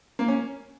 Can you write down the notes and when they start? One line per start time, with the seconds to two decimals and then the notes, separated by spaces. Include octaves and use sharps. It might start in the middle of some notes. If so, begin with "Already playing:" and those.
0.19 A#3
0.28 C#4